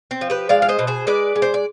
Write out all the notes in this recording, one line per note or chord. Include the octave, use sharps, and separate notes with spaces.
C4
F3
G4 B4
G#3 D5 F5
F5
C5 D#5
B2
G#4 C5
G#3 B4 D5
G#3
C5
D5